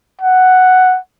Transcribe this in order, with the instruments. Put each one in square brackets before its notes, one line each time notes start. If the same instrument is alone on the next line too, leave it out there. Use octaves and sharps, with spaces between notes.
[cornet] F#5